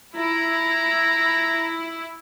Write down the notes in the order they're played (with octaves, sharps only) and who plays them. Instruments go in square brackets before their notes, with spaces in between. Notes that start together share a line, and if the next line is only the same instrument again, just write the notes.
[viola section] E4 [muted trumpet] A#5